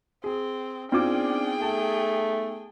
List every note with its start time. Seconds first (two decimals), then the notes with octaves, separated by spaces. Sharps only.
0.24 C4 G#4
0.92 B3 C4 D4 D#4 F4 G#4 G5 D6
1.62 A3 A5